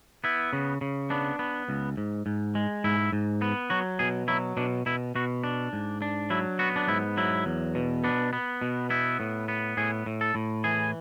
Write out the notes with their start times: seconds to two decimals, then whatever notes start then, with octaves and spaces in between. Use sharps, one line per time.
0.24 B3 E4
0.53 C#3
0.81 C#3
1.10 B3 D4
1.39 B3
1.69 C#2
1.97 G#2
2.26 G#2
2.55 G#3
2.84 G#2 E4
3.12 G#2
3.42 B3
3.70 F#3 F#4
3.99 B2 G#4
4.28 F#3 E4
4.57 B2 D4
4.86 B2 E4
5.15 B2 F#4
5.44 D4
5.73 G#2
6.02 D4
6.30 F#3 E4
6.59 B3 F#4
6.76 D4
6.88 G#2 E4
7.17 F#3 E4
7.46 E2
7.75 B2
8.04 B3 D4
8.33 B3
8.61 B2
8.90 B3 E4
9.20 A2
9.48 B3
9.77 A2 G#4
10.06 A2
10.21 A4
10.35 A2
10.64 E3 G#4